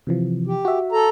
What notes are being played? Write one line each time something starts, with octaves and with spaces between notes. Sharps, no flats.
C3 E3 F3
G4
F#4 E5
A4 A#5